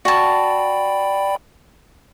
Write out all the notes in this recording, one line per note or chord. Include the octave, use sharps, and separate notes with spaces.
F#4 D5 G5 A5 B5